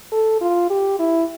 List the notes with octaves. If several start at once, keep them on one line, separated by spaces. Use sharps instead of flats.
A4
F4
G4
E4